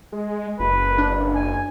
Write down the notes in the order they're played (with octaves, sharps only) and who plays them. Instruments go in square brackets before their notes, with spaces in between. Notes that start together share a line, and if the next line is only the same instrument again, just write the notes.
[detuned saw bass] G#3
[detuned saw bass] F#1 [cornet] B4
[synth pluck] D4
[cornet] G#5